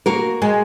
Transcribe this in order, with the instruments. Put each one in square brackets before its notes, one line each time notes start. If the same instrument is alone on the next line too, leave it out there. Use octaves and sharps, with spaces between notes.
[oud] A#3 [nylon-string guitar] F#4 A#4
[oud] G#3